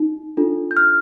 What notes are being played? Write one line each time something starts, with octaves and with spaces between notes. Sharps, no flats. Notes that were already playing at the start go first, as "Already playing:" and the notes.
Already playing: D#4
D4 F4 A4
G6
F6